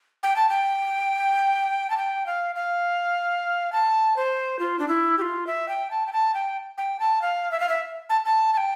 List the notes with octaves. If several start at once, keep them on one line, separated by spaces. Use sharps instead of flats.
G5
A5
G5
A5
G5
F5
F5
A5
C5
F4
D4
E4
G4
F4
E5
G5
A5
G5
A5
G5
G5
A5
F5
E5
F5
E5
A5
A5
A5
G5